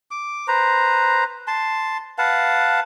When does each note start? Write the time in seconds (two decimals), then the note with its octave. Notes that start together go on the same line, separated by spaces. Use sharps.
0.11 D6
0.48 B4 C5 A#5
1.47 A5 C6
2.18 B4 F5 F#5 A5